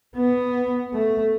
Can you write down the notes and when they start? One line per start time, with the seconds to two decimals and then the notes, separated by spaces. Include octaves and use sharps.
0.16 B3
0.94 A3